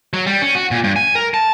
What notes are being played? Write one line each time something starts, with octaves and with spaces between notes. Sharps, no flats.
F#3
G3
C#4
F#4
A#2
G2
G#5
A#4
A5